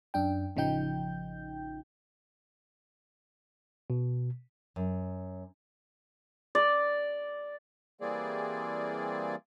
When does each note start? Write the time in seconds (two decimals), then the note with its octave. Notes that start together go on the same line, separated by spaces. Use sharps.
0.14 F#2 D4 G5
0.56 A1 C#3 F3 D#4 G5 G6
3.90 B2
4.76 F#2
6.55 D5
8.01 E3 G3 A#3 C4 G#4 D5